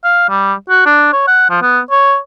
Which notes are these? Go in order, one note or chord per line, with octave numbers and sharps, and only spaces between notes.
F5
G3
F#4
D4
C#5
F#5
F3
B3
C#5